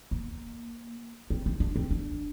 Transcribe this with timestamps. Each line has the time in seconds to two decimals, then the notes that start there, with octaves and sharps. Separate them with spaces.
0.11 A#3
1.30 C4
1.46 C4
1.60 D4
1.76 C4
1.91 D4